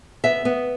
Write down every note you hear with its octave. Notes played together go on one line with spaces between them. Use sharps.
B3 E5
B3